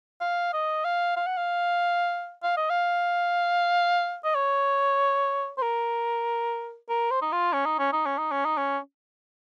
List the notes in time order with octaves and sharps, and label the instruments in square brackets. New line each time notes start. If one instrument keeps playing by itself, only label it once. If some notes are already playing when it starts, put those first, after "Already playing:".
[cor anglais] F5
D#5
F5
F5
F#5
F5
F5
D#5
F5
D#5
C#5
C5
A#4
A#4
C5
D#4
F4
C#4
D#4
C#4
D#4
C#4
D#4
C#4
D#4
C#4